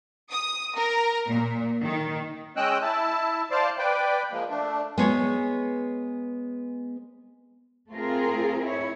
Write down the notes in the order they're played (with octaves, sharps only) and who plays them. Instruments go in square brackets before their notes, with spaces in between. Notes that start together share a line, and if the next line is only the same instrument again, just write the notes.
[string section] D#6
A#4
A#2
D#3
[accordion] G#3 C#4 D#5 G5 E6 F#6
E4 A5
C5 D5 F5 A5
B4 D5 G5
F3 G#3 A#3
A3 D4
[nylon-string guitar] G#3 B3 G#4 C#5
[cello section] A3 C4 F4 G#4 A#4
E4 C#5